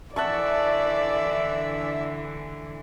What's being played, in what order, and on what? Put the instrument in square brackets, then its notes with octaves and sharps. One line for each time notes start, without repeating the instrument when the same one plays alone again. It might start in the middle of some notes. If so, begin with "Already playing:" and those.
[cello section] D3 E3 [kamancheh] D5 [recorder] E5 [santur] F#5 A5 C#6